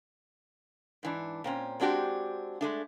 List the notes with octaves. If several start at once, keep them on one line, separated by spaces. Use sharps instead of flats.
G#2 E3 D4
A#2 C4 C#4
G#3 C4 D4 F#4 G4
G#3 A3 D4